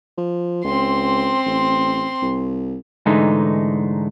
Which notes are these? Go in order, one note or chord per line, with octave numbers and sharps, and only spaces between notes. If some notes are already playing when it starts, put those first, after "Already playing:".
F3
C#2 C4 C6
A1
C2
G#2 D3 E3 G#3 A3 D#4